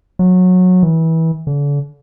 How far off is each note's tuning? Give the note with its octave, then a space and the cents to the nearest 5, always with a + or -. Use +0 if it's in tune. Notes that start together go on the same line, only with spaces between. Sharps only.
F#3 -20
E3 -25
D3 -40